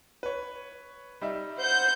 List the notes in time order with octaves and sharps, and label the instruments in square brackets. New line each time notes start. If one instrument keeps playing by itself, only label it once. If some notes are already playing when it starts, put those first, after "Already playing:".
[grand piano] B4 C#5
G3 D#4 E5
[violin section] C5 F#5 G6